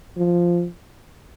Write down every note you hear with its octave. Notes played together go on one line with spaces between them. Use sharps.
F3